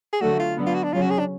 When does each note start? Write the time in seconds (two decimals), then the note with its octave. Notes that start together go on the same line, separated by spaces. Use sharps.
0.13 G#4
0.21 D3 F#3 A3 F#4
0.40 F4
0.57 D3 F#3 B3
0.66 F4
0.74 F#4
0.84 D4
0.93 C#3 F#3 C#4 F4
1.01 F#4
1.11 G#4
1.19 D4